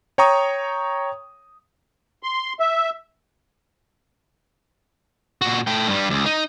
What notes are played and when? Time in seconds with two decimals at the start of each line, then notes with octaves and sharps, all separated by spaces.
0.18 C#5 G5 A#5 C#6 D#6
2.23 C6
2.60 E5
5.42 A#2 F#4
5.67 A3 G5
5.88 G2 G3
6.10 C#2
6.26 D#4